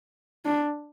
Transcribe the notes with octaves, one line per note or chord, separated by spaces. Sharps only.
D4